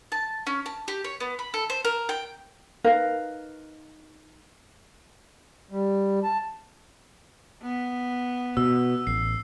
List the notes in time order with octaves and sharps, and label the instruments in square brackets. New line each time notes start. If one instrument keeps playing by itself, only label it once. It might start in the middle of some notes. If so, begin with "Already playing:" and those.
[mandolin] A5
C#4
A5
G4
C#5
B3
B5
A4
C5
A#4
G5
[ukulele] D#4 A#4 B4 F5
[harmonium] G3
A5
[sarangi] B3
[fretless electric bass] B2 [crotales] E6
[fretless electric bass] A1 [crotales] C7